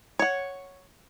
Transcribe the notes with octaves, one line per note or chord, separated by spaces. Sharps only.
C#5 F#5